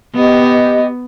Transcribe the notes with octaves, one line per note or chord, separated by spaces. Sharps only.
B3 G4 D#5